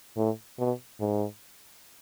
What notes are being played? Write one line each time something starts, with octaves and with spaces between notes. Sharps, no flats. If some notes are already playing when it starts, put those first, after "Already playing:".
A2
B2
G#2